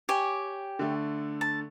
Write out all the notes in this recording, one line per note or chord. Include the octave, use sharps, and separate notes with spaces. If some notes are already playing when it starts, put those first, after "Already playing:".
G4 C#5 G#5
D3 A3
A5